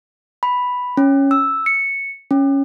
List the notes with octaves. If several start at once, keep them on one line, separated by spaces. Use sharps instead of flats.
B5
C#4
E6
C#7
C#4